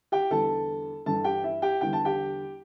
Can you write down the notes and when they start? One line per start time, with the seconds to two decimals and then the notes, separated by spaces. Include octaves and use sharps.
0.12 G4 G5
0.30 E2 D3 G3 A4 A5
1.06 G2 E3 G3 A4 A5
1.24 G4 G5
1.43 E4 E5
1.62 G4 G5
1.81 E2 D3 G3 G5
1.93 A5
2.05 G4 G5